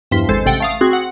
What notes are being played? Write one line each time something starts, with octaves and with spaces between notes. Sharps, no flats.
E2 G2 F3 C6 B6
G#1 G#3 A4 C5
A1 C3 A4 F#5 G5 A6
A3 F5 D#6
C4 F#4 G#4
F#5